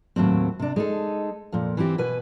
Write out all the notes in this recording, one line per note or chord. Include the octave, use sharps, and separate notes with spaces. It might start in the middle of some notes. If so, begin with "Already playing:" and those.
D#2 A2 F#3 C4
C3 D4
G#3 D#4 A4
F2 A#2
E3 C4 E4 G4
B2 B4 G#5